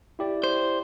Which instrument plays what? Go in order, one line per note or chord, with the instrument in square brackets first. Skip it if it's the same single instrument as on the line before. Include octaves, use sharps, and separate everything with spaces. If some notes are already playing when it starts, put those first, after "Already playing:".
[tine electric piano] E4 G4 D5
[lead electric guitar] C5